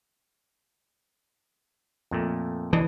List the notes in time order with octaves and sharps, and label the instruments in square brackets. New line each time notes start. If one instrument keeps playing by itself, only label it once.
[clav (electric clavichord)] F2 A#2 A3
[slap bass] E3 [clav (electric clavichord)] D4 D#5